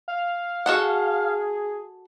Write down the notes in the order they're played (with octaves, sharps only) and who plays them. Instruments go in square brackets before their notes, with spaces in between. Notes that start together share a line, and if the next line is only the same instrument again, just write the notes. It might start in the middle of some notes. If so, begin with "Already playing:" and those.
[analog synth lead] F5
[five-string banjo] F#4 A4 F#5 [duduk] G#4